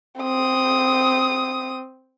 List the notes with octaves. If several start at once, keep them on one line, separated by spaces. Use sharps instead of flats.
C4 D#6